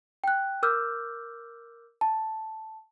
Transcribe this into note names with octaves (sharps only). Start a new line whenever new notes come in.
G5 F#6
A#4 D6 E6 F6 G6
A5